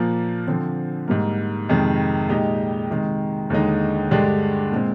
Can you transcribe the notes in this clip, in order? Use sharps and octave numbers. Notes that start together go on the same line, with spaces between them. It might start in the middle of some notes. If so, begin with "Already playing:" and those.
Already playing: A#2 F3 A#3
D3 F3 C4
G#2 G3 A#3
F2 C3 D#3 G#3
A#2 G#3 D#4 G4
C3 D#3 G#3
D#2 D3 G#3 D#4
G2 D3 G#3 D4 G4
A#2 G#3 C4